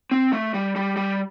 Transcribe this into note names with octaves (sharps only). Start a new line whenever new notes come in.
C4
A3
G3
G3
G3